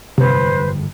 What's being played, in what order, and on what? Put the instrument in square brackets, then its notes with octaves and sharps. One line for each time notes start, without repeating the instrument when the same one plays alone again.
[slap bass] G1 F2 G#2 [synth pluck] C3 [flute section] B4 C5